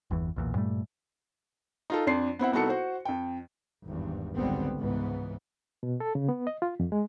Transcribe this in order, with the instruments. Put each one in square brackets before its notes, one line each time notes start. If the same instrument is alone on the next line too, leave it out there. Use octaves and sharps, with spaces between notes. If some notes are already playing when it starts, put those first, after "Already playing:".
[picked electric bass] G1 E2 E3
B1 E2 A#2
G2 A#2 G3 A3
[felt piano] D#4 F4 A4
F2 D4 C6 C7
B3 C4 E4 F#5
C2 B3 D#4 F#4 A4 C#7
F#4 C5
F2 G5
[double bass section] G#1 E2 G2
G#1 C#2 D3 G3 B3 C4
C#2 G#2 E3 B3
[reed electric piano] B2
A4
C#3
B3
D#5
F4
F2
G#3